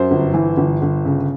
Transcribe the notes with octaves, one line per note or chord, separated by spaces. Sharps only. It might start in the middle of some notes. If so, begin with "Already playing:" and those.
Already playing: F#2 C5
G1
E3
G1
G1
C#3